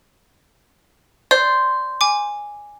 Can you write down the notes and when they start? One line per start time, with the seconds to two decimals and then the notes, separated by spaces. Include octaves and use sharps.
1.31 C5 D5
2.01 G#5 D6